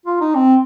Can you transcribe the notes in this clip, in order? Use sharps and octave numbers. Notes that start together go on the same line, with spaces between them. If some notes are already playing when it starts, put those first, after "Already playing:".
F4
D#4
C4